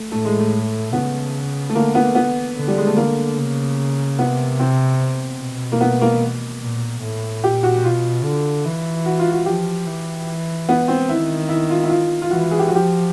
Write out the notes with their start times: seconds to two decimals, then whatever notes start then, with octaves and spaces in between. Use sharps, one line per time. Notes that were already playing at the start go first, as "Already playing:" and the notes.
Already playing: A3
0.12 A2 A3
0.25 G#3
0.39 A3
0.93 C#3 B3
1.69 A3
1.75 D3 A#3
1.95 B3
2.15 B3
2.56 D3
2.68 G3
2.78 G#3
2.87 A3
2.96 D3 A#3
3.37 C#3
4.18 C3 B3
4.59 C4
5.40 B2
5.72 A#3
5.81 B3
6.01 A#3
6.62 A#2
7.02 A2
7.44 A#2 G4
7.63 F#4
7.84 B2 F4
8.24 D3
8.66 E3
9.06 F#4
9.19 F4
9.32 F#4
9.46 F3 G4
9.86 E3
10.69 B3
10.88 C4
11.09 D#3 E4
11.49 E4
11.70 F4
11.84 E4
11.90 F4
12.22 F4
12.31 E3 F#4
12.51 G#4
12.59 G4
12.68 F#4
12.72 F3 G4